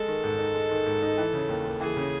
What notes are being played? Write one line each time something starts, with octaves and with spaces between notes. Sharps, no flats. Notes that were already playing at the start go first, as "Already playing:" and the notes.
Already playing: G#3 A4
D#3
G#2
D#4
G#3
D#3
G#2
D#4
E3
C#3
D#2
D#2
E3 G#4
C#3